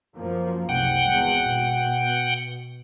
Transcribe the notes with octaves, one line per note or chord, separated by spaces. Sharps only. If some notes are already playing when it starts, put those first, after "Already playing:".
F#2 F3 A#3
F#1 C2 F#5 G5
G#1 E2
B2